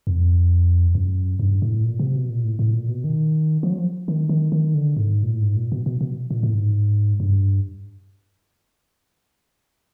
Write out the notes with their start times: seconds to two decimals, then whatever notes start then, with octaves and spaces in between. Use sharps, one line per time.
0.07 F2
0.95 F#2
1.40 G2
1.62 A2
1.84 A#2
2.00 C3
2.15 B2
2.30 A#2
2.44 A2
2.59 A2
2.73 A#2
2.89 B2
3.04 D#3
3.63 F3
3.70 F#3
3.78 F3
4.08 D#3
4.29 D#3
4.52 D#3
4.74 D3
4.97 G#2
5.23 A#2
5.32 A2
5.42 G#2
5.56 A#2
5.72 B2
5.86 B2
6.01 B2
6.31 A#2
6.43 A2
6.53 G#2
7.20 G2